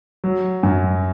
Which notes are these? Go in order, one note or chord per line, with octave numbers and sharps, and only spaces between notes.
F#3
F#2